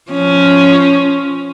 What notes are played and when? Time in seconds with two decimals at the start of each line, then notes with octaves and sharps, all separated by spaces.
0.11 F3 C#4